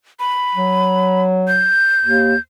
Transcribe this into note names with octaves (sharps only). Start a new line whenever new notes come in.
B5
F#3
G6
D#2